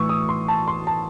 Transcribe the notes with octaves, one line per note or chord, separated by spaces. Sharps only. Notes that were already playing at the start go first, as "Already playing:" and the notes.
Already playing: A2 E3 C#6 E6
D#6
C6
A5
C6
A5